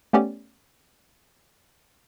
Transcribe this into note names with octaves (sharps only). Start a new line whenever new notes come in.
A3 B3 C#4 G4 D5